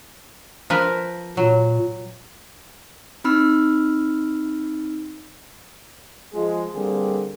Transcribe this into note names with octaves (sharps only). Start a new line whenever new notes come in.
F3 A#4 B4
A#2 F#3
C4 D#4 B5 E6 F6
F3 G#3
D3 G3 A#3 C4 G#4